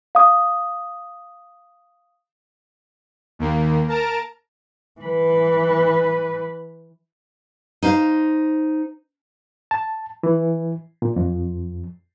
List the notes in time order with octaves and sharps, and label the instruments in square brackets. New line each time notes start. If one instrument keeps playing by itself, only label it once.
[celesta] F5 D#6
[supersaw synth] D#2 A#3
A#4 A5 A#5 D7
[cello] E3 B4
[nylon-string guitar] D#4 C5 F5
[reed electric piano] A5
E3
A#2
F2